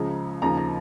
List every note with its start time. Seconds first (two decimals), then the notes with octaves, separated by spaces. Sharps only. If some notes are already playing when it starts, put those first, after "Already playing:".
Already playing: C#2 C#3 F3 A#5
0.42 D#2 C#3 F3 A#5
0.57 A#5